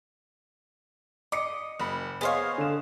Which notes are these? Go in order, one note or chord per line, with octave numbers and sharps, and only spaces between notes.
D#5 D6 C#7
F#1 B5
B3 G#4 C5 C#5 D#5 F5
D3 E7